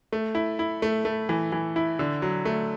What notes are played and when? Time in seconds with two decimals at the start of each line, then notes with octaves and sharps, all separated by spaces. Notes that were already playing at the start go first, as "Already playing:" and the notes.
0.12 A3
0.35 E4
0.59 E4
0.82 A3
1.05 A3
1.29 E3
1.52 E3
1.76 E4
1.99 D3
2.22 F#3
2.45 A3